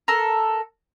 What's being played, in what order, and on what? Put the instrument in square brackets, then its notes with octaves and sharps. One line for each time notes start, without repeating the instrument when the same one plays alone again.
[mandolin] A4 A#4